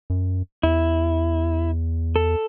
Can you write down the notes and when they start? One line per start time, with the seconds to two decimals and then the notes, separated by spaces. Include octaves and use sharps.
0.10 F#2
0.63 E2 E4
2.16 A4